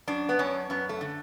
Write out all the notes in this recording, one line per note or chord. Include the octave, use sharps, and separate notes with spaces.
F#2 D4
B3
F#2 C#4
F#2 B3
A3
D3